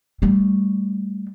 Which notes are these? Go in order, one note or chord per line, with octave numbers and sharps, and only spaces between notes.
G3 A3